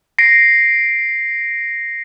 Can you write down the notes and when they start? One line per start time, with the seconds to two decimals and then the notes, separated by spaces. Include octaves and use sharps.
0.18 A#6 C7 D7